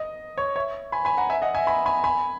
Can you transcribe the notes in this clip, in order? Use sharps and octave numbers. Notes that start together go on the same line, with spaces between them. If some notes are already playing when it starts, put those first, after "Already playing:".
Already playing: D#5
C#5
C#5 E5
G#5 B5
G#5 B5
F#5 A#5
E5 G#5
D#5 F#5
E5 G#5
G#5 B5
G#5 B5
G#5 B5